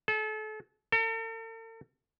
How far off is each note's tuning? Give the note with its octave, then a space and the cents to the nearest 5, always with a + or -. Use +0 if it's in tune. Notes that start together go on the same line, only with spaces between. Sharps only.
A4 -35
A4 +45